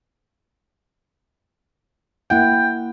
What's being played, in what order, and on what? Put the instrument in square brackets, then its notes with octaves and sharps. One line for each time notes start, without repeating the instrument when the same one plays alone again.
[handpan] A#3 E4 F#5 [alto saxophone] G5